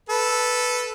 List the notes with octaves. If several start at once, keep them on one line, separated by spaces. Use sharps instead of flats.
A4 B4